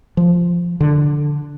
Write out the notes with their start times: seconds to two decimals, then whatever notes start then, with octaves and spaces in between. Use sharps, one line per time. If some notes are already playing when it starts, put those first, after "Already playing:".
0.17 F3
0.81 D3